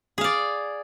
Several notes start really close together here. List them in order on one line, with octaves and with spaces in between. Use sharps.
G#4 F5 D5